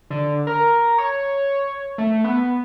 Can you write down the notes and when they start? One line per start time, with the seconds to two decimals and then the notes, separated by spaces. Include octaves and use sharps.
0.10 D3
0.47 A#4
0.98 C#5
1.98 A3
2.24 B3